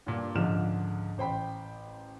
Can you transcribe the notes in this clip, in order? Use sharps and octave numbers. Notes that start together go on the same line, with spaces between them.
G2 A#2
C#2 G#2 D3 F3 F6 E7
A1 C5 G5 B5